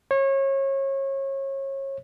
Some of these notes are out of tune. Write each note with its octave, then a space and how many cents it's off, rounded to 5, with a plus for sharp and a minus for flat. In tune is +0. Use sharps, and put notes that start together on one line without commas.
C#5 -30